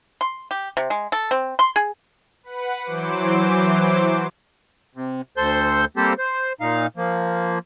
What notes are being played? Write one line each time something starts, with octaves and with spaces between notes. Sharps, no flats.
C6
G4
C3
G#3
A4
C4
C6
G#4
B4 F#5
E3 F#3 C5 D6
C3
D2 A4 C5 G6
G3 A#3 C4 G4 A4 C5
C5
A#2 D#4 F5
F3 A#3